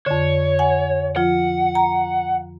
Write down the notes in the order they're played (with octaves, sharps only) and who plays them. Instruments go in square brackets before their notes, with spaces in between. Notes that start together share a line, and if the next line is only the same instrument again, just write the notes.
[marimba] F2 D3 [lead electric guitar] C#5
[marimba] F#5 G#5
[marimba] F3 F4 [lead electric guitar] F#5
[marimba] A#5